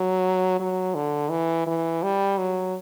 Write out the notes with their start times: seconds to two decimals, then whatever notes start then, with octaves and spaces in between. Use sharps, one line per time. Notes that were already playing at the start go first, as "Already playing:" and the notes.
Already playing: F#3
0.59 F#3
0.95 D3
1.30 E3
1.67 E3
2.03 G3
2.38 F#3